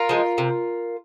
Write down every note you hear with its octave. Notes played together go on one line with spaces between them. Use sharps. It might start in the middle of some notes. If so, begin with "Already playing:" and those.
Already playing: F4 A#4
F3 G#3
C3